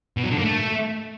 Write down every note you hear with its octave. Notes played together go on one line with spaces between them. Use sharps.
B2
F#3
D3
A#3
A3